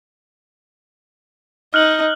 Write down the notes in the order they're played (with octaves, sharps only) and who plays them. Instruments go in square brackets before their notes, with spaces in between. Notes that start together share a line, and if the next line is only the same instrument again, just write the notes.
[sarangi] D#4 [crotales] F6 F#6 F#7